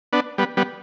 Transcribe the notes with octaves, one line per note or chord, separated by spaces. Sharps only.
B3 D4
G3 B3
G3 B3